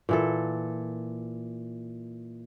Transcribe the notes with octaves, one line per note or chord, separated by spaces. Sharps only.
A#2 E3 A4